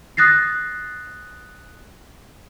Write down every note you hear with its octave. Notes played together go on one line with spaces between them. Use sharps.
D#6 F#6 A6 A#6 C7